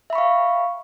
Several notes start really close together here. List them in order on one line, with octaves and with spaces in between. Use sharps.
E5 B5 C#6 F5